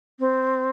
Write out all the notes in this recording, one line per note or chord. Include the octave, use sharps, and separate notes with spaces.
C4